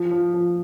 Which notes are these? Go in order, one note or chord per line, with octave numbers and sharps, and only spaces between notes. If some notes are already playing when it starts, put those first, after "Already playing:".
Already playing: F3
F3
F3